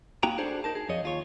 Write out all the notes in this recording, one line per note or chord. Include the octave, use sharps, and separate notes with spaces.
A#3 D#4 F#4 G5 A#5
D4 F#4 G#4 A4 C5 D5
D#4 A#4 A5
G#4
F2 F3 C#5 D#5
D#2 F4 C#5